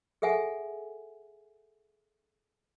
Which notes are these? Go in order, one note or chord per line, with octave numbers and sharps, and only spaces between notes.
G#4 A4 E5 F#5 G#5